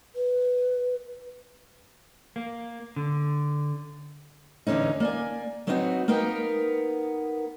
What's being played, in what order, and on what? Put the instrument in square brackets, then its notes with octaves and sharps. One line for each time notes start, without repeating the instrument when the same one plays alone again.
[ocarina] B4
[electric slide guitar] A#3
D3
[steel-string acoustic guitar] E2 G2 D3 C#4 D#4
A#3 D5 G#5
F#3 B3 C4 D#4 F4 F#4
A#3 B3 D#4 A#4 G5